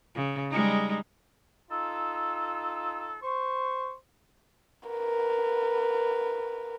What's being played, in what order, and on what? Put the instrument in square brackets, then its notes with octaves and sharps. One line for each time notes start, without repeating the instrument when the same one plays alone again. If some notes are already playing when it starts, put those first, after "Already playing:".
[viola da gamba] C#3
G3 G#3 D#4
[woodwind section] D#4 F4 A4 E6
C5 C#6
[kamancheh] A#4 B4